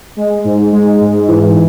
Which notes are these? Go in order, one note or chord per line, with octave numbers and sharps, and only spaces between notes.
G#3
G#2
G#3
G#2
E3